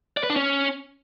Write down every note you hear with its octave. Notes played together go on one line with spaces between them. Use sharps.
D5
B4
D4
C#4